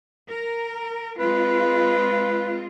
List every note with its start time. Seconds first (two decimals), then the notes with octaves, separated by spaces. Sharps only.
0.29 A#4
1.18 G#3 C4 F4 B4